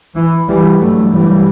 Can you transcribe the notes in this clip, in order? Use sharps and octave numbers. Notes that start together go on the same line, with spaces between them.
E3
E3 G3
G2 F#3 A3
E3 G3